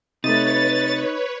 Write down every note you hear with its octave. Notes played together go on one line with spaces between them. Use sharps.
C3 A3 D#4 B4 C#5 A6